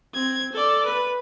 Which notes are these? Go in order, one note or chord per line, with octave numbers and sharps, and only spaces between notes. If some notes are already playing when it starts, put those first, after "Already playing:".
C4 G#6
A4 D5
B4